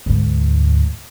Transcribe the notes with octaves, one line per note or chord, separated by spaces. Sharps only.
D2 G#2